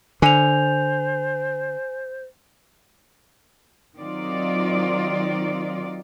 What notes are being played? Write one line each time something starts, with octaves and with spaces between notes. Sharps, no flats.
D3 C5 G#5 F7
D#3 F#3 C4 D#4 F4 D5